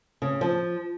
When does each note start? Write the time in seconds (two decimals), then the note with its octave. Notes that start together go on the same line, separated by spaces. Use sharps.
0.22 C#3
0.41 F3